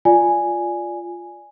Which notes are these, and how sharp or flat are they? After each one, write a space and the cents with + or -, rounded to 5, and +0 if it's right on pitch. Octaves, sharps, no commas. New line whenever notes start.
F4 +0 D5 +0 G#5 +0